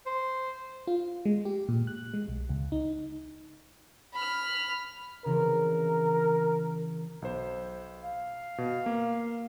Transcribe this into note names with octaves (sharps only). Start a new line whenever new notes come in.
C5
F4
G#3
G4
A#2
F#6
G#3
B1
C#2
D#4
B5 F6
C#3 E3 C4 A#4
B1 C5
F5
B2
A#3